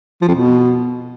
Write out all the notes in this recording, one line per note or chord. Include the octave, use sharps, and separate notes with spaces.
F3
F2
B2